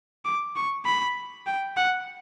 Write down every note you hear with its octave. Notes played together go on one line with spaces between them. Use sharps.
D6
C#6
B5
G5
F#5